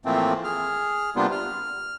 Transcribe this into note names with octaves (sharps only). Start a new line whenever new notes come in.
A2 E3 F3 A3 A#3 C4
G#4 F6
C3 G3 A#3 B3 D4 F4
F6